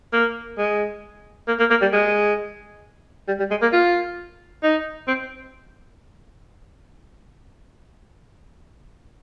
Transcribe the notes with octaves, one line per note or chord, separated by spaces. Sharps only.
A#3
G#3
A#3
A#3
A#3
G3
G#3
G3
G3
G#3
A#3
F4
D#4
C4